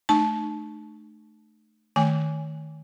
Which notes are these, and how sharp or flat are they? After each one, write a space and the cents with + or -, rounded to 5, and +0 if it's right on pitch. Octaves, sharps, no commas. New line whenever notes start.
A3 -15 D#4 -45 A5 -20
D#3 +0 A3 +0 G#5 +0